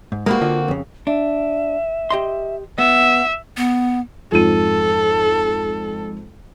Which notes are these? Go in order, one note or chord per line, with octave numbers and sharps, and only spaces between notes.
G#2
G#3 A#3 C4 F#4 A#5 B5
D3 F4 D#5
F2 C#3
D4 E5
G4 D#5 C6
B3 E5 F#5
B3
F2 G#2 A4 D#7